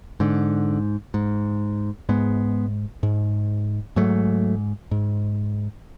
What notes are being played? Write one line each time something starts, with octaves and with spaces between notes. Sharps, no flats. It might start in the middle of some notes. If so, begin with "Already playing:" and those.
G#2 D3
G#2
G#2 G#3 B3
G#2
G#2 F#3 A3
G#2